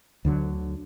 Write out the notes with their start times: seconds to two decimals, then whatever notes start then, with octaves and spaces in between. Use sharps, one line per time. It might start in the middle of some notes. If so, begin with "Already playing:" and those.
0.25 D2 D3 E3 F#3